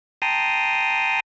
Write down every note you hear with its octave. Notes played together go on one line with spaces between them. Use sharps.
G5 A5 A#5 C6 D#6